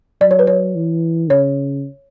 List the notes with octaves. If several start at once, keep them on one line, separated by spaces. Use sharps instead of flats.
F#3 D5
C#5
B4
C#5
E3
C#3 C#5